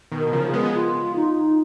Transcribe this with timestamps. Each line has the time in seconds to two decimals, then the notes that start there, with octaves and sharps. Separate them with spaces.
0.11 B2 D#3
0.18 A#4
0.27 D#3
0.33 C#3 F3
0.46 G#4
0.53 G#3 B3
0.74 F4
1.16 D#4